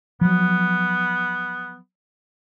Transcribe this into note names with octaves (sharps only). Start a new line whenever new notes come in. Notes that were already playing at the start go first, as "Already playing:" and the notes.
F3 F#3 B3